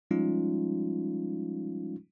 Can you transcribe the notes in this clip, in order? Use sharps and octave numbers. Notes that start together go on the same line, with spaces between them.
F3 G3 G#3 C#4 D#4 F4